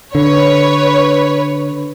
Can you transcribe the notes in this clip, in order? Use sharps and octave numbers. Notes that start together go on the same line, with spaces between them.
D3 B4 C#5